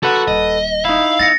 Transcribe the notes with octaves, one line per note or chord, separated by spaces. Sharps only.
F#4 A4 B4 F#5
D#1 D#5
D#4 E4 F5
B3 A6 A#6 C#7